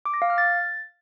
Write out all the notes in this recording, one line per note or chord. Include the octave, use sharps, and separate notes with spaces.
D6
A#6
F5
F6
A6